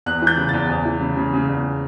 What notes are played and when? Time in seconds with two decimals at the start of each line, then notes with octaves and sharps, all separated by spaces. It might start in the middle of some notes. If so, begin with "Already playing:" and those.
0.06 E2 F#6
0.22 E3
0.27 G6
0.38 C#3
0.49 E2 A6
0.69 E2
0.85 E3
1.01 C#3
1.17 C#3
1.33 C#3
1.49 E2